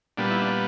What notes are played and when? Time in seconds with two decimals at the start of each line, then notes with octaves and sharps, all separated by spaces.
0.17 A#2 G3 B3 D4
0.30 E4
0.42 D4